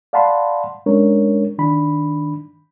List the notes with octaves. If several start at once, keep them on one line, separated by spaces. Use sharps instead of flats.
D5 F5 F#5 A5 B5 C6
G#3 C#4 D4 A#4 C#5
D#3 D4 B5